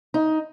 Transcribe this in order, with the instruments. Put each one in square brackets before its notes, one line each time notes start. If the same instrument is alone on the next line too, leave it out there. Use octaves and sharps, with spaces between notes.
[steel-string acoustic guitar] D#4